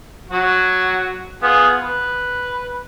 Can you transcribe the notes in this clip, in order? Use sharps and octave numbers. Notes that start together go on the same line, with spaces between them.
F#3 F#4
B3 F4 G#4
B4